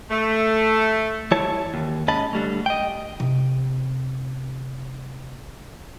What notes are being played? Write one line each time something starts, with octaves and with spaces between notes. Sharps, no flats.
A3
E3 G3 E4 C#5 A5
D#2
G#2 C#4 D#5 A5 B5
D3 G3 A3
D#5 G5
C3 C4